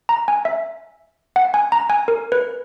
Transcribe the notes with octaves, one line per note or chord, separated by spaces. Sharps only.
A#5
G#5
E5
F#5
G#5
A#5
G#5
A#4
B4